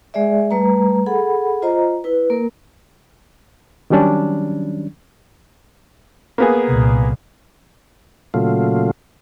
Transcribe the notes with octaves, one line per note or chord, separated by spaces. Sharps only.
G#3 G#4 D5 E5
G3 A3 B4 A#5
G#4 A4 F#5 B5
F4 C5 D#5 A#5
E4 B4
A#3 A#4
D#3 F#3 G3 C#4 D4
A#3 B3 G#4
C2 A#2
A#2 C#3 F#3 A3 F4